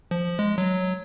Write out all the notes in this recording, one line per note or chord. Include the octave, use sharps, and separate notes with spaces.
F3
G#3
F#3